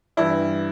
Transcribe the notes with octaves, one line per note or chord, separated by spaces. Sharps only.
G2 E3 E4